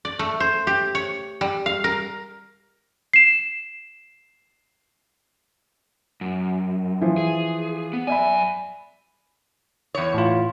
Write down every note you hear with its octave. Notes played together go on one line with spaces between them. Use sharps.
D5
A3
C5
G4
C#5
G3
F5
A#4
C7 E7
F#2
E3 F3
G#4
B3
F#2 D5 E5 G#5 B5
E2 C#5
A2 F4